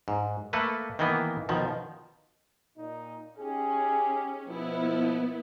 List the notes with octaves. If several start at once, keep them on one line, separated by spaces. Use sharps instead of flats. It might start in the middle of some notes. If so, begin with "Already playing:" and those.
G#2
A3 A#3 A4 B4
D#3 E3 A#3 B3
B2 D#3 F3
A#2 D#4
C#4 D#4 G4 G#4
B2 F3 B3 E4